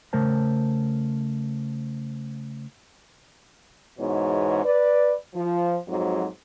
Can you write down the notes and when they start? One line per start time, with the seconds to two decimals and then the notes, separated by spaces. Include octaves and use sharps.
0.13 C#3 A3 A#4 C5 A5
3.98 E2 G#2 B2 C#5
4.64 B4 D5
5.34 F3
5.87 F2 G#2 F#3